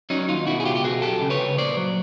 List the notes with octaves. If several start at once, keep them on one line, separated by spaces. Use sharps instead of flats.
F#3 C#4 D#4
D#2 D#4 F4
B2 E4 F#4
G#4
C#2 F4 G4
G4
B2 F#4 G#4
F#2 G4 A4
C#3
B4 C#5
C#3
A#2 C5 D5
F#3